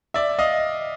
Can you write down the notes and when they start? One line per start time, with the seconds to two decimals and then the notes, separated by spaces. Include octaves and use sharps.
0.14 D5 E5
0.39 D#5 F5